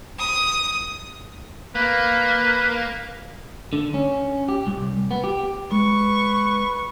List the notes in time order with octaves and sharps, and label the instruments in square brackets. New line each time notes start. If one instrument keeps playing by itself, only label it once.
[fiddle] D#6
[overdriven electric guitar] A#3 [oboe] B4
[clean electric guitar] D3
C#4
G4
C2
B3
G4
[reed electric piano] G#3 [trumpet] B4 [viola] C#6